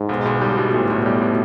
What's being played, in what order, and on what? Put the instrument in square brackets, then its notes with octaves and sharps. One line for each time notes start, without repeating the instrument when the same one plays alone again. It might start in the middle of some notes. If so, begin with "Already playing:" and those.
Already playing: [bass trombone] G#2
[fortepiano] B1
B1
G3
B2
[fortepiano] B1 [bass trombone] A2
[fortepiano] B1
G3
B2